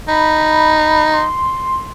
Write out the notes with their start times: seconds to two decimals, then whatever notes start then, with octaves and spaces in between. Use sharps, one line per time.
0.08 D#4 B5
1.14 C6